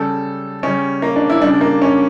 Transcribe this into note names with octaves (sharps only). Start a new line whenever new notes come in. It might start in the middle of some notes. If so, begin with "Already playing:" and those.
Already playing: C#3 G3 A4
C#3 G3 C#4
A#3
D4
E4
C#3 G3 D4
A#3
C#4